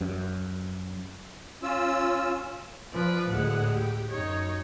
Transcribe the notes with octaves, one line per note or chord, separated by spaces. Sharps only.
F#2
C#4 F4 E6
F3 B4 D5
D2 A2 G#3 F#5
G4
F#2 D#4 C#5